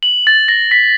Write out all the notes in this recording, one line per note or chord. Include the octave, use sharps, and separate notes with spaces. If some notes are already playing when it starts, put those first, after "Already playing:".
F#7
A6
A#6
B6